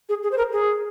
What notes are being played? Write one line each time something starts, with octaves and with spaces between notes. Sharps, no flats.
G#4
G#4
C5
A#4
G#4